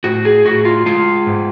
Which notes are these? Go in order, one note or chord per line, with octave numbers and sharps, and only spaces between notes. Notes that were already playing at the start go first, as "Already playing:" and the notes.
A2 F#4
G#4
A2 F#4
F4
G#3 F4
G#2